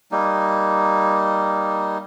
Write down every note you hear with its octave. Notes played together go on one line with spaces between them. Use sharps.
G3 A#3 D#4